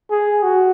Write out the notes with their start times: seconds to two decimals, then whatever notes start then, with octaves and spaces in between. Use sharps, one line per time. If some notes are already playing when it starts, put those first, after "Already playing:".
0.11 G#4
0.43 F#4